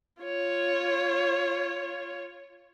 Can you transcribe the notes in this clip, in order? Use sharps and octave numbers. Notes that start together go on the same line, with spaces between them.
F4 C#5